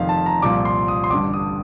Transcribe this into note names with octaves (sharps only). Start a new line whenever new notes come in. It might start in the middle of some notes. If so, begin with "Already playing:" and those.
Already playing: F1 F2 D#3 F5
A5
A#5
C2 A#2 F3 D6
C6
D#6
C6
A1 G2 D3 D6
D#6